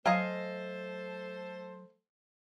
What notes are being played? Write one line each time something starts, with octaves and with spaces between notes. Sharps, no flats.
F#3 A3 A4 C5 D#5 F5 G#5